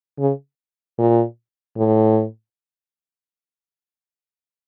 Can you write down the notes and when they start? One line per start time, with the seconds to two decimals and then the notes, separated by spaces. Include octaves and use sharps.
0.19 C#3
0.98 A#2
1.77 A2